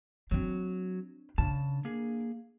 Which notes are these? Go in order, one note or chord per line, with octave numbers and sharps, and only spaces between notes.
F#3 C4 D4
C#3 D4 A5
A#3 G#4